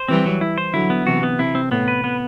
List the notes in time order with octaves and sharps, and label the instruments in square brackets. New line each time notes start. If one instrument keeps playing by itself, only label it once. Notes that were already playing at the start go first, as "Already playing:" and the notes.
Already playing: [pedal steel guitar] C5
[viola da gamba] E3 G3 [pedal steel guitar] C4
[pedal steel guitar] F#3
E4
C5
[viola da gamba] D3 F#3 [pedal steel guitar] E4
[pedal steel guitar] B3
[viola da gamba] C3 E3 [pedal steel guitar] F#4
[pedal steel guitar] B3
[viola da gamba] C3 [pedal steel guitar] E4
[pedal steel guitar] C4
[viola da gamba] A2 [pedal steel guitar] B3
[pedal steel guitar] B4
B3